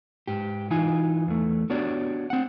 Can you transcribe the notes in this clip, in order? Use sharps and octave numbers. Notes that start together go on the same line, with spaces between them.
G#2 G4
E3 D#4 F4 G#5
E2 A3
B3 D4 F#4 G4 C#5 D5
C4 F#5